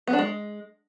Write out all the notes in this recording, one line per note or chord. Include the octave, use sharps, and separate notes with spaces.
B3
D4
G#3